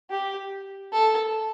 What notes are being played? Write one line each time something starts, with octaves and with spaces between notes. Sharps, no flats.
G4
A4